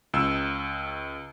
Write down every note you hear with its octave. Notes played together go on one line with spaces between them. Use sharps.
C#2 E6